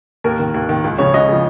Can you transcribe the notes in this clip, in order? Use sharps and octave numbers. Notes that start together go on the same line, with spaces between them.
D#2 A#4
D#3
D#2
D#3
C#2
C#3 F3 C#5
C#2 D#5
C#3 F3